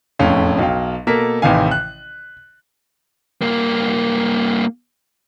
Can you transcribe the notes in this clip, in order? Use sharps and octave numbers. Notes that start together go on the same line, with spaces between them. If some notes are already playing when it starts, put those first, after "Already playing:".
E1 F2 A2 C#4 F5
B1 F#3 F5 G5
B2 A#3 A4 A#4 B6
A1 C3 D#3 E3 F5 G#5
F#6
G2 A#3